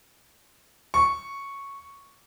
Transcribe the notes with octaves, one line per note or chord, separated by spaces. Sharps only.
C#6